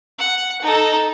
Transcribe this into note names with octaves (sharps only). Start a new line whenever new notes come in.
F#5
D#4 A4